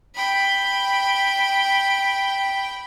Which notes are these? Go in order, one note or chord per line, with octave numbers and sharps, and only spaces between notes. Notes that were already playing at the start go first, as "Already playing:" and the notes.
G5 B5